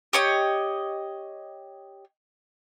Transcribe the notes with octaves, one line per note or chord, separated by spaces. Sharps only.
G4 C#5 D#5